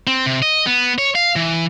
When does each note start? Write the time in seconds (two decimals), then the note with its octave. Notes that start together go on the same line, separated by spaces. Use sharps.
0.07 C4
0.26 C3
0.42 D#5
0.67 B3
0.98 C#5
1.15 F5
1.36 E3